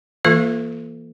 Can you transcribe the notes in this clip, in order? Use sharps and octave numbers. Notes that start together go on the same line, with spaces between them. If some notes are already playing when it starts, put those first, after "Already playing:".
E3 A#3 F4 A4 F5